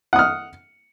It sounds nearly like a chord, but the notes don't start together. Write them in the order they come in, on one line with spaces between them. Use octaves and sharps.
F#5 D#6 F6